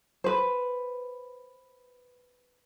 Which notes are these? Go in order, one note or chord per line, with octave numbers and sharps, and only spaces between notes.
B4 C5